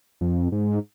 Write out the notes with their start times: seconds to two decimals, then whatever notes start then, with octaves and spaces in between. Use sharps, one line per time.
0.21 F2
0.52 G#2